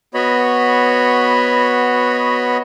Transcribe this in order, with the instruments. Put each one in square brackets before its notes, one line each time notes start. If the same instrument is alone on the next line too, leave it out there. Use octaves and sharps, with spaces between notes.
[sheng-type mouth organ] B3 F#4 C#5 D#5 B5